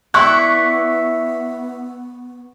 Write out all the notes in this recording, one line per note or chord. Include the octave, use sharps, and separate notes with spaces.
B3 E4 D5 E5 C#6 F#6